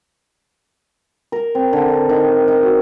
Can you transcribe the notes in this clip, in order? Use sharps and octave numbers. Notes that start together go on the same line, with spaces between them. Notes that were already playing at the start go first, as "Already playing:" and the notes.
A#4
C4
D3
D3
D#3
D#4
F#4